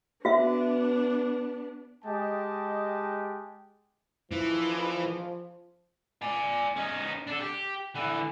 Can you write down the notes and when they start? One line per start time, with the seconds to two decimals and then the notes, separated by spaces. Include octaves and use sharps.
0.25 B3 D4 F#4 E5
2.05 G#3 G4 D#5 G5 A5
4.32 E3 F3
6.22 D5 G#5
6.76 C#4 D#4
7.27 D4 A4
7.40 G4
7.95 D3 E3